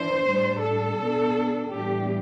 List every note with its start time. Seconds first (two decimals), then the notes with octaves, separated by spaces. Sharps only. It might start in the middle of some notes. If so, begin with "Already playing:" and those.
Already playing: E3 D4 C5
0.26 A2 G3 D4
0.63 A4
0.99 B2 B3 D4
1.71 A2 E3 G3 B3 D4 G4